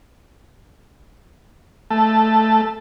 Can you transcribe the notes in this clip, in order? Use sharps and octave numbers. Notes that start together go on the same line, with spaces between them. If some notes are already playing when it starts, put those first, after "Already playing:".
A3